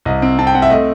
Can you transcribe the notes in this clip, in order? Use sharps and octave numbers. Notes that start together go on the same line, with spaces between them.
C2 D#5
C4
C4 A5
G5
C4 F#5
E5
A3 D#5